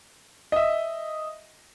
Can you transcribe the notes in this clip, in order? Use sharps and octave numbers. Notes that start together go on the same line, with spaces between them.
D#5 E5